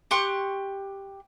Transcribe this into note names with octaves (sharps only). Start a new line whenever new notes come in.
G4 C6 C#6 F#6